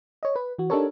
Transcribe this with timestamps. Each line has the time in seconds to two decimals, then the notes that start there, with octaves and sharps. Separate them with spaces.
0.23 C#5 D#5
0.36 B4
0.58 E3 F#4
0.70 D4 D#4 G4 A4 A#4 C#5